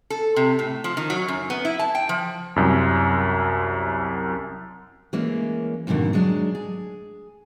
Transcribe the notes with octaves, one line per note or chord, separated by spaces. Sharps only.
A4
C3
A2
F3
D#3
F#3
F#2
B3
E4
A5
G5
F3
C2 F#2
E3 G#3 A#3 C#4
F2 G#2 B2 D3 D#3
F#3 G#3 D4
G#4